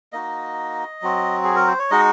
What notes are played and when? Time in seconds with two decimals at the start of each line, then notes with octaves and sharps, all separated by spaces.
0.13 A#3 D#4 F#4 D#5
1.02 F#3 C4 F#4
1.44 G#4
1.56 A#4
1.67 C5
1.79 C#5
1.91 G#3 D#4 F#4 D#5